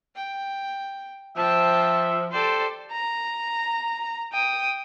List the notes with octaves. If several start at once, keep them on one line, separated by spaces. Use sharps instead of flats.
G5
F3 C5 E5 G5 A5
G4 A4 C5 D5
A#5
G5 D#6